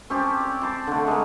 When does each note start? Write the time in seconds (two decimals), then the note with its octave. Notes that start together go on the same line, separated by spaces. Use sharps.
0.10 C4 C#4 G4 A5
0.40 D5
0.62 A5 C6 D6
0.87 D3 A3
1.07 G#3 A#4